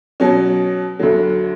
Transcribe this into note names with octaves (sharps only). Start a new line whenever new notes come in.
B2 F#3 C#4
D2 D3 F#3